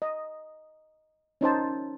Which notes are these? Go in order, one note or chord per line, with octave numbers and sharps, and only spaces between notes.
D#5
C#4 D#4 C5 A5